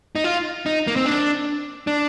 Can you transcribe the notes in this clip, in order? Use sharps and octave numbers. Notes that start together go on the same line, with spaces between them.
D#4
F4
D#4
A#3
C4
D4
D4